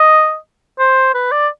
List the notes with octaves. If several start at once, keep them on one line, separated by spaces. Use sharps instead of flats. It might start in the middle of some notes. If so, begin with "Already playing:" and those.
Already playing: D#5
C5
B4
D5